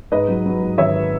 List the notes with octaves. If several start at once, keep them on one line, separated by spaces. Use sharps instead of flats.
G#2 B4 D#5
F#3
F#3
G#2
G#1 C#5 E5